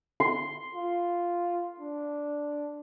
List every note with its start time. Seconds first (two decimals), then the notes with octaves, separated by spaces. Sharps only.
0.20 C6
0.75 F4
1.80 D4